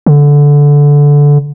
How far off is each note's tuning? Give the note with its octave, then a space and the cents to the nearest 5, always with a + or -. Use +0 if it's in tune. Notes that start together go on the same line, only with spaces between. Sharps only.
D3 -15